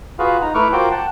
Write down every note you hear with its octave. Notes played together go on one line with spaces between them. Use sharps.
F4 F#4 G#4 B4 F5
D#4 A#5
A3 E4 B4 C#6 D6 F6
F4 F#4 A#4 C5 G5 D6
F#5 G5 A5